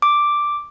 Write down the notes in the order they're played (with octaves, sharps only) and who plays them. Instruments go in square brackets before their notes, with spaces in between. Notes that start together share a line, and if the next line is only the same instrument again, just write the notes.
[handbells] D6